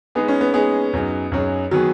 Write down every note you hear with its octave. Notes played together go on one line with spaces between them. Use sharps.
G#3 B3 D#4 G#4
C#4
B3
G#3 B3 D#4 G#4
F#2 F#3 D#4 G#4
F#2 F#3 D#4 G#4
D#3 F#3 B3 G#4